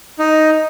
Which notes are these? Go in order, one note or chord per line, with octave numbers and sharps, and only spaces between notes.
D#4